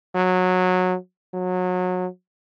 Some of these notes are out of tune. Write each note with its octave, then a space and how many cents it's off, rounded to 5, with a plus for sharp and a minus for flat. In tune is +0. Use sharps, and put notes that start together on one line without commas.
F#3 -15
F#3 -25